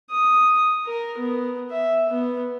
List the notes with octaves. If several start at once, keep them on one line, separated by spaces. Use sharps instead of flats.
D#6
A#4
B3
E5
B3